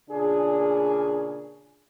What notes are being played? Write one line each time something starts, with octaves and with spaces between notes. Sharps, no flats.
A#2 C#3 D4 G#4